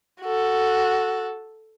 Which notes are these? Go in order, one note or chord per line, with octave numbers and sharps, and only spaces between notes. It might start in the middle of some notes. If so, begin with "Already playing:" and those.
F#4 A4